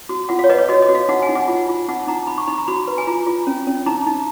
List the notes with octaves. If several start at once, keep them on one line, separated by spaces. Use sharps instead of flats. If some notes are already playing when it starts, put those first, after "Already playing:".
F#4
F4 F#5
F5
C#5
B4 D#5
C#5
F#4 D#5
D#5
F#4
F5
D#4 F#5
G#5
D#4
F#5
F4
F4
D#4 F#5
D#4 A#5
D#4 B5
C#6
D#4 B5
A#5
F#4 B5
B4
G#5
F4 A#5
F4
C#4
C#4
D#4 A#5
D#4